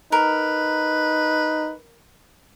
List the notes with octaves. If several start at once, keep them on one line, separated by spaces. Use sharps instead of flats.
D#4 A#4 B4